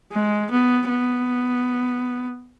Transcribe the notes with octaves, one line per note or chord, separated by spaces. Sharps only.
G#3
B3
B3